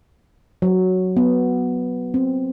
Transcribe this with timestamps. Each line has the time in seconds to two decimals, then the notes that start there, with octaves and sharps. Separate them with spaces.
0.62 F#3
1.17 B3
2.14 C4